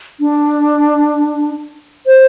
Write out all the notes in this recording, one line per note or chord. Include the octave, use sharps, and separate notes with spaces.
D4
C5